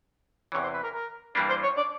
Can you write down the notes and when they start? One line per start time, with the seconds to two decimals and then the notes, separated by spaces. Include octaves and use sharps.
0.52 E2 C3 E3 C#5
0.63 C5
0.74 B4
0.83 A#4
0.94 A#4
1.35 G2 E3 G3 A#3 D4 B4
1.49 C5
1.63 C#5
1.77 D5